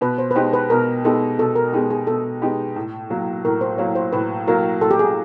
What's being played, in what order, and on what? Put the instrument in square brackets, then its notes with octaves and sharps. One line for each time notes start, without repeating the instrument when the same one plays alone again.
[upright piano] B2 [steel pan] B4
[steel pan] C5
B4
[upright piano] G#3 B3 D#4 G4 [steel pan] C5
[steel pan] B4
[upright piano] B2 [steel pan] A#4
[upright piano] G#3 B3 D#4 G4 [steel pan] A4
[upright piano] B2 [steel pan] A4
[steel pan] A#4
[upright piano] G#3 B3 D#4 G4 [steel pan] G#4
[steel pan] G#4
[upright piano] B2 [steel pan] A4
[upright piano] G#3 B3 D#4 G4
A2
F#3 A#3
[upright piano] A2 [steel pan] A#4
[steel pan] C5
[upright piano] F#3 A#3 [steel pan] C#5
[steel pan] C5
[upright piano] A2 [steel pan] B4
[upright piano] F#3 A#3 [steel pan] A#4
[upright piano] A2 [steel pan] A4
[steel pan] G4
G#4